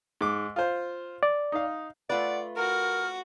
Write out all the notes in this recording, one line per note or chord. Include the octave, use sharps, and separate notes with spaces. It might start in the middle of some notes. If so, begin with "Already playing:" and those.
G#2 D6
F4 C5
D5
D#4 F5
A3 F4 B4 D5 F#5
F#4 A#4 F6